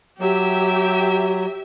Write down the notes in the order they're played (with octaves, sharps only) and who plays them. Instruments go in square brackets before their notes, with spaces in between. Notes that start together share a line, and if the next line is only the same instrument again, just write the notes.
[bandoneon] F#3 [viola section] G4 E5